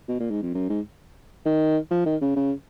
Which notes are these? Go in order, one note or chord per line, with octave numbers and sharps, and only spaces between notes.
B2
A#2
G#2
F2
F#2
G#2
D#3
F3
D#3
C#3
C#3